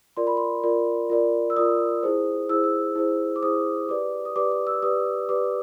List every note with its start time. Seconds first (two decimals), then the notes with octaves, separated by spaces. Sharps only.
0.17 F4 A#4 D5 C6
0.27 B5
0.37 C6
0.64 F4 A#4 D5
1.10 F4 A#4 D5
1.50 E6
1.56 F4 A#4 D5 D#6
2.03 E4 G#4 C5
2.49 E4 G#4 C5 E6
2.64 E6
2.95 E4 G#4 C5
3.36 D6
3.42 E4 G#4 C5 D#6
3.89 G4 B4 D5 D6
4.25 D#6
4.36 G4 B4 D5 D6
4.51 D6
4.67 E6
4.82 G4 B4 D5 D#6
5.29 G4 B4 D5 D6